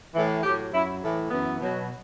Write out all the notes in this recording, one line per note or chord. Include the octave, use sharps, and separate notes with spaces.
A2 E3
A2 F#3 G4
F#2 F#3 E4
A2 E3
F#2 E3 B3
B2 F#3